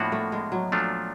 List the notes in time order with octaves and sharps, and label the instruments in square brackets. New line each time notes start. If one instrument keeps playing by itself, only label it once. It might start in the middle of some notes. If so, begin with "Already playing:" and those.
Already playing: [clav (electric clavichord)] A2 F3 A#3 D4 F#4 [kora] B3
[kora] A3
G#3
F#3
[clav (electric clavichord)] A#2 F3 A3 D4 F4